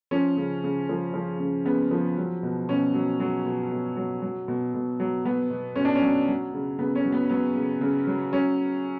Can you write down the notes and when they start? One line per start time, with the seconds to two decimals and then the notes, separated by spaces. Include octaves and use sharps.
0.11 F3 C#4
0.37 C#3
0.64 C#3
0.89 F3
1.14 F3
1.39 C#3
1.65 C#3 B3
1.91 F3
2.17 F#3
2.43 B2
2.69 B2 C#4
2.94 F#3
3.20 F#3
3.46 B2
3.72 B2
3.97 F#3
4.22 F#3
4.48 B2
4.74 B2
5.00 F#3
5.25 F#3 B3
5.50 B2
5.76 B2 C#4
5.85 D4
5.95 C#4
6.02 F#3
6.28 F#3
6.53 C#3
6.79 C#3 B3
6.95 C#4
7.05 F#3
7.12 B3
7.29 F#3 B3
7.55 C#3
7.81 C#3
8.07 F#3
8.32 F#3 C#4